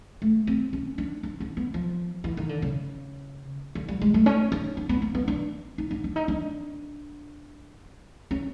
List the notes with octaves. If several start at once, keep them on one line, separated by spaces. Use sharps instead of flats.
A3
C4
C#4
D4
D4
C#4
B3
F3
E3
D#3
D3
C#3
D3
G3
G#3
A3
C#4
D4
D4
B3
A#3
B3
D4
D#4
D4
D4
D#4
D4
C#4